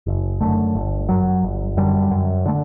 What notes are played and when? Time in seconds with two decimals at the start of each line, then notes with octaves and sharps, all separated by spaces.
0.07 F#1
0.41 F#2 D3 A3
0.75 G1
1.09 F#2 F#3
1.43 G1
1.77 F#2 D3 G3
2.11 F#2
2.45 D3 A3